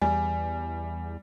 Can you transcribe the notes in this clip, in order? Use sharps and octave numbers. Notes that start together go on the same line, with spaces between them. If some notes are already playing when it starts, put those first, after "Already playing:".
E2 G3 G#5